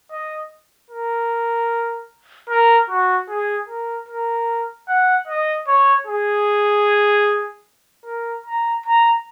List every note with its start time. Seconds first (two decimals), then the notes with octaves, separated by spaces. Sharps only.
0.12 D#5
0.91 A#4
2.50 A#4
2.90 F#4
3.29 G#4
3.69 A#4
4.09 A#4
4.89 F#5
5.28 D#5
5.68 C#5
6.07 G#4
8.06 A#4
8.46 A#5
8.86 A#5